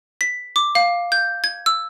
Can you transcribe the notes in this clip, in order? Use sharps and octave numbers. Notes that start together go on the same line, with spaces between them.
B6
D6
F5
G6
G#6
E6